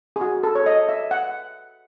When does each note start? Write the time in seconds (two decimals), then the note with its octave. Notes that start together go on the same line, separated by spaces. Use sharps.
0.16 G#4
0.21 F#4
0.43 A4
0.55 C#5
0.66 D#5
0.89 E5
1.11 F#5